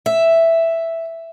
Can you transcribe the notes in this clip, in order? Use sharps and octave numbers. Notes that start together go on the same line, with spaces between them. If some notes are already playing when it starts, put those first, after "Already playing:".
E5